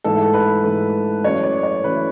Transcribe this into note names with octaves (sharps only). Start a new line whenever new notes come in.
G#2 E3 A3 A4
B4
G#2 E3 A3
F#2 E3 A3 C#5
D5
C#5
F#2 E3 A3 B4